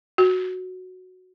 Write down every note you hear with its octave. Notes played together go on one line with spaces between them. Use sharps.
F#4